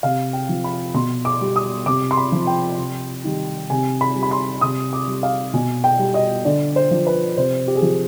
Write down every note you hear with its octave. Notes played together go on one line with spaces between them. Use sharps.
C3 F5
G5
F3
B5
B2 C6
D6
G3
D#6
C3 D6
C6
B5
F3
G5
C3
D#3 G3
C3 G#5
B5
G3
B5
C6
C3 D#6
D6
G3
F5
B2 G#5
G5
G3
D#5
D3 D5
C5
F3
B4
C3 C5
G4
G#4
F3 G4